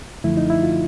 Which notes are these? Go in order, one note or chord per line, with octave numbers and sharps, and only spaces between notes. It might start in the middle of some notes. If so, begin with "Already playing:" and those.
F#2 D3 F3 A3 E4
D#4
E4
F4